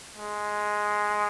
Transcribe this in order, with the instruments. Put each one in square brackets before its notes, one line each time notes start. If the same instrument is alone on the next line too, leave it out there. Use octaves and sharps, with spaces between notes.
[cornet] G#3